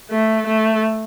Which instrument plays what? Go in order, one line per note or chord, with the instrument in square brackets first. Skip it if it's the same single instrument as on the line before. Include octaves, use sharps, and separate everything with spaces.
[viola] A3
A3